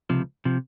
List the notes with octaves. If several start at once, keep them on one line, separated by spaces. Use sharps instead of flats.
C#2 C3 F3
C3 F3